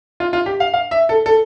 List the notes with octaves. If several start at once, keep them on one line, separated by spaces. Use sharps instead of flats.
F4
F4
G4
F5
F5
E5
A4
A4